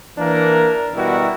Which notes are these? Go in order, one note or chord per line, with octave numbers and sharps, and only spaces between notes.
E3 A#3 D4 A#4
B2 G3 E4 F#4 A#4